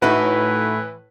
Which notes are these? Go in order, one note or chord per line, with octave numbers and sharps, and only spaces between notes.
A2 E3 D#4 E4 F#4 B4